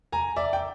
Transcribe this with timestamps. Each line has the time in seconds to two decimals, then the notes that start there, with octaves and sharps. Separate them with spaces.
0.12 G#5 A#5
0.36 D5 E5
0.53 G5